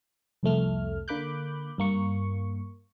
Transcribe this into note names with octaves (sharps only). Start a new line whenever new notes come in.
C2 F2 A3 F6
D3 A#3 B5 D6 F#6 G6
G2 A#3 C#6